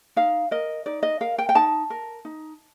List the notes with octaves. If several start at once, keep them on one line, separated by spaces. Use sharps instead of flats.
D#4 F5
A#4 D#5
D#4 D5
D#5
A#4 F5
G5
G5
D#4 A5
A#4
D#4